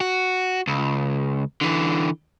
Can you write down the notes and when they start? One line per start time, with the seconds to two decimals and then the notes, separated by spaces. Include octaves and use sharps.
0.01 F#4
0.67 C#2
1.61 D3 E3